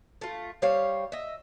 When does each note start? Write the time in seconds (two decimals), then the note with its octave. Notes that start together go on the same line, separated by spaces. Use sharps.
0.21 A3 F4
0.62 G3 C5 C#5 F5
1.12 D#5 E5